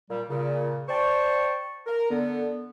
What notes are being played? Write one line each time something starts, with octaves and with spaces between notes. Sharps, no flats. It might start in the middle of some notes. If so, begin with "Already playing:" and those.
A#2 G3
A#2 C#3
C5 D5 G5 A5 C#6
A#4
D3 B3